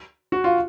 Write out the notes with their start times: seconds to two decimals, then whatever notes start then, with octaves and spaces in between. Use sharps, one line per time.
0.32 F#4
0.44 F4